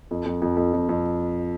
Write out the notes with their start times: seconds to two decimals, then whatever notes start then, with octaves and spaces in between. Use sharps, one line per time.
0.11 F2
0.25 F2
0.42 F2
0.57 F2
0.73 F2
0.89 F2